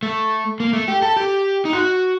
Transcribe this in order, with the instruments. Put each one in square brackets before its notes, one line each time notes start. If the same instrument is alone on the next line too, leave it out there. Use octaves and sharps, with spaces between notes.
[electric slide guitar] A3
A#3
A3
G4
A4
G4
D#4
F#4